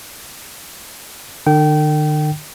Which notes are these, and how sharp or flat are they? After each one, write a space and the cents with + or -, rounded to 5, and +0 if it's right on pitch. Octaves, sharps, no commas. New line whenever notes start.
D3 +45 G5 -25